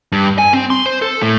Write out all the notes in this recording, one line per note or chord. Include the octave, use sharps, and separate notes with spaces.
G2
G#5
C4
C6
C5
A4
A2